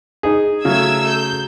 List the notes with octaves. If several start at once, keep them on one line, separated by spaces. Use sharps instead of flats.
D#4 G#4
C#3 F#3 A3 E6 G#6
G6